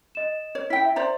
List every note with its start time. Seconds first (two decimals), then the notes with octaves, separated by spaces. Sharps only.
0.15 D#5 E7
0.55 C#5
0.70 E4 G5 B6
0.85 E5
0.96 C5 D5 A#5